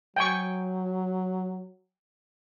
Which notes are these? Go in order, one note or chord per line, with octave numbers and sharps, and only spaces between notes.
F#3 G5 G#5 C#6